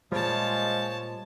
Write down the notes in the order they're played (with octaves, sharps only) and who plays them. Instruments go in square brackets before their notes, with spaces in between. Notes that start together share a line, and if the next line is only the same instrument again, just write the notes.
[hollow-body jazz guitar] A#2 G3 [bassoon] F3 [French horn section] G#3 [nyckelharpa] C#5 A5